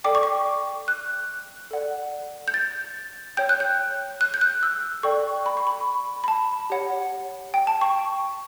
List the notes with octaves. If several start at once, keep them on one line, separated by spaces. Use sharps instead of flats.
A4 D5 G5 D6
C#6
D6
F#6
A4 D5 F#5
G6
A6
C#5 G5 G6
F#6
G6
F#6
G6
F#6
E6
A4 D5 G5 C#6
B5
C#6
B5
B5
A5
G4 C#5 F#5
G5
A5
C#6